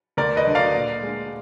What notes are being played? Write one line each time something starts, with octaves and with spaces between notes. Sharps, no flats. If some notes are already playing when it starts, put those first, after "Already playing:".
D2 A#4 D5
B4 D#5
D3 F#3 D4
D5 F5
A#2
G#3 D4